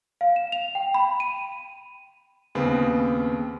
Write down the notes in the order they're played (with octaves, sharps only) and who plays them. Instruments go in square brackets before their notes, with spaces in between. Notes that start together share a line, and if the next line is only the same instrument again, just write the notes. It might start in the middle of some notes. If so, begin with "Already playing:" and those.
[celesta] F5
E7
F7
G5
B5
D#7
[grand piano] D#2 C#3 B3 C4